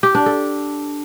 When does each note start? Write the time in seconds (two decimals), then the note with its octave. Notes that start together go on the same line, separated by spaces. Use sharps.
0.03 G4
0.15 D4
0.26 A4